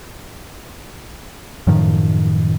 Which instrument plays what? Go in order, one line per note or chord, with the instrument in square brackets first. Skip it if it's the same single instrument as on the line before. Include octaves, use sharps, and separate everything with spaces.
[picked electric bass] F#2 A2 D#3 F3